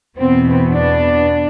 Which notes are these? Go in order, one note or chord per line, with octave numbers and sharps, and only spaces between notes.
E2 B2 B3 C4
D4